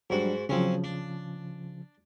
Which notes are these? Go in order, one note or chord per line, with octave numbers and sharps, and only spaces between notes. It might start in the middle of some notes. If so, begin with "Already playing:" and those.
G#2 F#3 G3 D4 F#4
C#3 F3 F#3 C4 C#4
D4